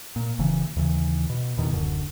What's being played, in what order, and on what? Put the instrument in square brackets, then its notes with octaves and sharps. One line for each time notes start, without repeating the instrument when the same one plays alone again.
[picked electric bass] A#2
F#1 C#3 E3
D#2 C#3 E3
B2
E2 B2 D#3
D1 F#2 D3